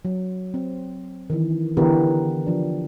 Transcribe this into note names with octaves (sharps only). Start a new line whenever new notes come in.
F#3
C4
D#3 E3
D3 E3 B3 G4 A#4 B4
F3 D4